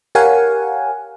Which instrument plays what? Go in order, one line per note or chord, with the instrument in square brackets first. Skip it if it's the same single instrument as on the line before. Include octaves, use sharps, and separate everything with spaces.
[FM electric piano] G4 A#4 C#5 F5 F#5 G#5